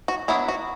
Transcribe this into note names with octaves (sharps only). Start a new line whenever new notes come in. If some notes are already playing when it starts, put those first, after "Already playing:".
F#4
F#3 B3 D4 E4
F#4